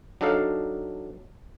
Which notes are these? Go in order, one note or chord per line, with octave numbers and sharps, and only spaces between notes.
F#3 D4 D#4 A4 F5